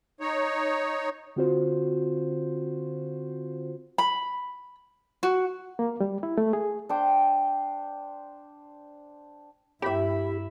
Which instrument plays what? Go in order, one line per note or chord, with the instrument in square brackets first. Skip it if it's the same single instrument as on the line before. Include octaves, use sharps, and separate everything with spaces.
[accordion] D#4 C#5
[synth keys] D3 C4 F4 F#4 C5
[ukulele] B5
F#4
[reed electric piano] A#3
G3
E4
A3
G#4
[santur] D4 C5 G5
[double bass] G2 E4 [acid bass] G4 [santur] E5 B5